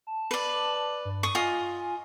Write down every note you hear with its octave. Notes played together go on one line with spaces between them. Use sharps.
A5
B4 D5
G2
C#6 D#6
F4 D#5 G#5 D#6